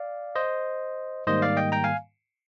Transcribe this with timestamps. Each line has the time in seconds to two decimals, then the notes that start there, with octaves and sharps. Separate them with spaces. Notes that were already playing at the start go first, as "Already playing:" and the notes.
Already playing: D5 F5
0.36 C5 D#5
1.27 G#2 D#3 G3 A#3 C5 D#5
1.42 D5 F5
1.57 D#5 G5
1.72 G5 A#5
1.84 F5 G#5